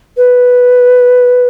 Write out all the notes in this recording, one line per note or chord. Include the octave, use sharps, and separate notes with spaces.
B4